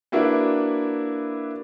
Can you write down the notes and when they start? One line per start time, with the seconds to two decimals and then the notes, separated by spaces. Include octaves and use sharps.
0.12 A#3 D4 E4 F#4 B4